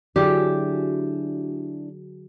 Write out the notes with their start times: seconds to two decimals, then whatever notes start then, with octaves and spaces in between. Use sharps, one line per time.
0.16 D3 F#3 D4 E4 G4 G#4 D5